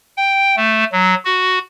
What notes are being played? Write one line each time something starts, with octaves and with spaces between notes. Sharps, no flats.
G5
A3
F#3
F#4